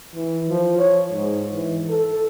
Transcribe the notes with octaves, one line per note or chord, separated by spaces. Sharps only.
E3
F3
C#5
G#2
E3
A4